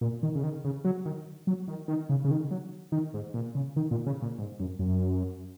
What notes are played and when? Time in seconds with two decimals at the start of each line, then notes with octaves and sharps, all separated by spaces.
0.01 A#2
0.23 D#3
0.35 C#3
0.43 D#3
0.64 C#3
0.85 F#3
1.05 D#3
1.47 F#3
1.68 D#3
1.88 D#3
2.09 C#3
2.25 C#3
2.31 D#3
2.51 F#3
2.92 D#3
3.14 G#2
3.34 A#2
3.55 C#3
3.76 D#3
3.91 A#2
4.07 C#3
4.22 A#2
4.39 G#2
4.60 F#2
4.79 F#2